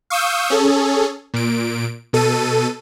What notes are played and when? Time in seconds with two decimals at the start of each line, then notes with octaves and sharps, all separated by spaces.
0.10 F5 C#6 D#6 E6 G6
0.50 C#4 G#4 A4
1.34 A#2 D7
2.13 B2 A4 D#7